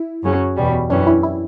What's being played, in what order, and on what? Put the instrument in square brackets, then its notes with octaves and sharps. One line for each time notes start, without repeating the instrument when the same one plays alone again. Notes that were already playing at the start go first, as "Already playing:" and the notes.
Already playing: [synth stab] E4
[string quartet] F#2 C#3 F#3 C#4
E2 B2 G3 C#4
[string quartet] F#2 E3 G3 C#4 [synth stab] D4
[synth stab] E4
E4